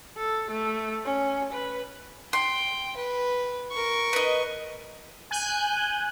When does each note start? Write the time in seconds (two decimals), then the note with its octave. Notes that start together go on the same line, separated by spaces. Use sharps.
0.17 A4
0.51 A3
1.05 C#4
1.53 B4
2.33 G5 C6
2.97 B4
3.72 A#4 C#6
4.13 B4 D#5
5.31 G#5 F#6 G6